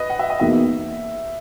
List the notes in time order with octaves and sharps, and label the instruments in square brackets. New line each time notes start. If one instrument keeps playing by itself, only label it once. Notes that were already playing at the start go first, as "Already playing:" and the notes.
Already playing: [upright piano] B4 D#5
F#5
E5
D#5
[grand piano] E2 B2 A#3 D#4 [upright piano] E5